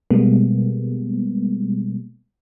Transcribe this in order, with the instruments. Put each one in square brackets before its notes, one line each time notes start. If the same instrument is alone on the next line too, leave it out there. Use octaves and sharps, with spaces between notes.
[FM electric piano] B2 G3 G#3 A#3 B3